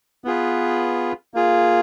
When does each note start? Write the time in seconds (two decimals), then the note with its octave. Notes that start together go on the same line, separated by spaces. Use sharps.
0.24 B3 F4 G#4 B4
1.34 A#3 F4 G#4